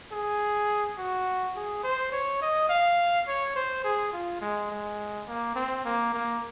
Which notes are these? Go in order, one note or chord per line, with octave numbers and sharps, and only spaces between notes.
G#4
F#4
G#4
C5
C#5
D#5
F5
C#5
C5
G#4
F4
G#3
G#3
A#3
C4
A#3
A#3